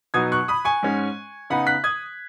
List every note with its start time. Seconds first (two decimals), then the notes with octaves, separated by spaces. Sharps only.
0.14 B2 F#3 B3 D#4 D#6 G#6
0.32 C#6 F#6
0.48 B5 D#6
0.65 G#5 C#6
0.83 G#2 G#3 C#4
1.50 C#3 B3 D#4 F#5 B5
1.67 F#6 B6
1.84 D#6 G#6